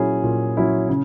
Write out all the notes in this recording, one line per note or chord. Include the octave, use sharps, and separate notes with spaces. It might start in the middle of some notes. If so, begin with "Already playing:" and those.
Already playing: A#2 F#3 C#4 E4 G#4
A#2
F#3 C#4 E4
C#3